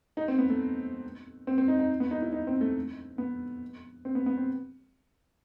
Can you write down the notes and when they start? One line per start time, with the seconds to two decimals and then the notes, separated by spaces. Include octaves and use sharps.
0.17 D#4
0.28 C4
0.38 B3
0.50 A3
1.47 C4
1.58 C4
1.68 D#4
1.79 D#4
2.00 B3
2.11 D#4
2.22 E4
2.32 D#4
2.47 C4
2.61 A3
3.18 B3
4.05 C4
4.15 B3
4.26 B3
4.38 C4